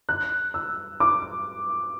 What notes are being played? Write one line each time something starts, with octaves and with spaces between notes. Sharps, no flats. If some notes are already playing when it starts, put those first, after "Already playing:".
F#6
E6
D6